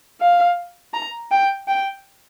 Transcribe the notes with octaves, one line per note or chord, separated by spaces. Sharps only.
F5
A#5
G5
G5